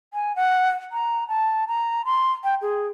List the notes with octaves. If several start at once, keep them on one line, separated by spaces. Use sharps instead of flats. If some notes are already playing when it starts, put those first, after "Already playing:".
G#5
F#5
A#5
A5
A#5
C6
G5
G#4